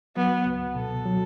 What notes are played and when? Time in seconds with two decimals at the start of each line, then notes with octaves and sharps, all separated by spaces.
0.16 F#3 B3
0.45 C#2
0.75 B2 A4
1.05 F#3